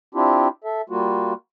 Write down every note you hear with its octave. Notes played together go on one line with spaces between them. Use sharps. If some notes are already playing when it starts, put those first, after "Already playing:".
C4 D4 E4 F4 G4
A4 E5
G3 A#3 F4 F#4